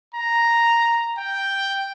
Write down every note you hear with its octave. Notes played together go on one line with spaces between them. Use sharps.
A#5
G5